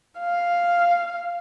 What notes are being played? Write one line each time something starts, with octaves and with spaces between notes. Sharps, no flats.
F5